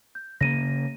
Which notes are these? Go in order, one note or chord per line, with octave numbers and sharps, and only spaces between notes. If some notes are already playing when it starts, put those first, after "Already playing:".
G6
C#3 A#3 A#6 D#7